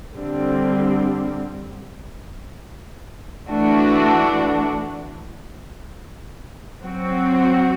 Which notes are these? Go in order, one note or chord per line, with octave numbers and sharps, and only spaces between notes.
D3 G3 C4
E3 A3 D4 F#4
F#3 C4 F#4